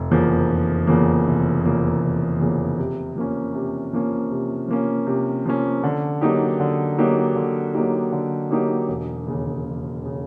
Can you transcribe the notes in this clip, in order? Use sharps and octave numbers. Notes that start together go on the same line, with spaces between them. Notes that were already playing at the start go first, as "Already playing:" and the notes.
Already playing: F1
E2 C#3 F3 A#3
F1
E2 C#3 F3 A#3
F1
E2 C#3 F3 A#3
F1
E2 C#3 F3 A#3
C3
F3 A#3 C#4
C3
F3 A#3 C#4
C3
F3 A#3 C#4
C3
F3 A#3 C#4
D3
F#3 A#3 D#4 G4
D3
F#3 A#3 D#4 G4
D3
F#3 A#3 D#4 G4
D3
F#3 A#3 D#4 G4
E1
D#2 C#3
E1
C#3